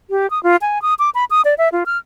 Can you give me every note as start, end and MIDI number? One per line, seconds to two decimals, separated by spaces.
0.10 0.29 67
0.30 0.42 87
0.43 0.56 65
0.62 0.81 80
0.82 0.94 87
0.99 1.10 86
1.15 1.25 83
1.31 1.42 87
1.45 1.54 74
1.58 1.69 76
1.72 1.84 65
1.86 1.98 89